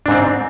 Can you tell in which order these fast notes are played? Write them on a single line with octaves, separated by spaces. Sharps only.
D4 G#2 C4